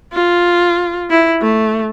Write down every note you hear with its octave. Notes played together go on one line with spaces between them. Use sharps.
F4
E4
A3